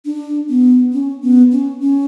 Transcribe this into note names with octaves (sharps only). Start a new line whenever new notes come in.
D4
B3
C#4
B3
C#4
C#4